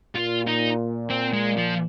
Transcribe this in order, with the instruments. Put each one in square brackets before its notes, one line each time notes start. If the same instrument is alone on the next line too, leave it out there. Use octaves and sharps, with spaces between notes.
[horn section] A#2 [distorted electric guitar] F4
[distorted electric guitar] D#4
C4
G#3
F3